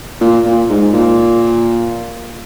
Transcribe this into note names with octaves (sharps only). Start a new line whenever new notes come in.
A#2
A#2
G#2
A#2